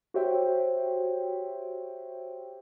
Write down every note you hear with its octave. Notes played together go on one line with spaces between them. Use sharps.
F#4 G4 C5 C#5 E5 G5